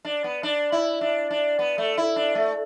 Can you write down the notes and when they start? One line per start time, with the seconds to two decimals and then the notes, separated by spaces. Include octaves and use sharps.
0.05 D4
0.24 B3
0.43 D4
0.72 E4
1.01 D4
1.30 D4
1.59 B3
1.78 A3
1.98 E4
2.16 D4
2.35 A3